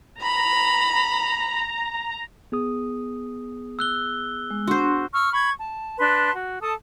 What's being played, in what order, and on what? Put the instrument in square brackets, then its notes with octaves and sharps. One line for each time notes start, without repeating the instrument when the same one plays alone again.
[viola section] A#5 [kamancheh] B5
[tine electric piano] B3 G#4 D#6
[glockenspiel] E6 F#6 G7
[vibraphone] G#3
[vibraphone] D4 C6 [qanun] F#4 C5
[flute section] C#6 E6 F6
B5 C#6 G#6
A5
D4 B4 A5 C6
F#4
A4 A5 D#6